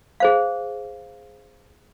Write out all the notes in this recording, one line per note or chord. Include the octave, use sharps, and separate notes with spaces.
G#4 C5 F5